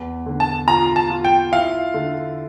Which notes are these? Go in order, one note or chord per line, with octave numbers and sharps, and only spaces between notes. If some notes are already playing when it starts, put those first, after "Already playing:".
Already playing: E2
D3
A5
F4 A#5
A5
F4
G5
E4 F5
D3